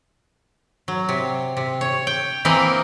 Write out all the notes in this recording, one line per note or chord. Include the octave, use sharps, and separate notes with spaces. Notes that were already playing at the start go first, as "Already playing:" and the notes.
F#3
C3
C3
C#5
G5
E3 A#3 C4 A#4 B4 D#5